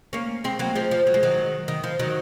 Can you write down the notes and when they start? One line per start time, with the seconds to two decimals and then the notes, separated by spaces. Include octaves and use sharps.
0.13 A#3 C#4
0.44 G#3 C4
0.59 F#3 A#3
0.75 F3 G#3
0.91 F3
1.07 F#3
1.14 G#3
1.23 D#3 F#3
1.68 D#3
1.84 F3
1.99 D#3 F#3